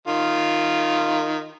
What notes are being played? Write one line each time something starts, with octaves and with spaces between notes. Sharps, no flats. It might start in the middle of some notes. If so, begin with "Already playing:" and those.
D#3 F4